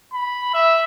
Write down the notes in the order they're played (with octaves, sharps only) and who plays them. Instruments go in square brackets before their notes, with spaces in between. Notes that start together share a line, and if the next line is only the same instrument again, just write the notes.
[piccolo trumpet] B5
E5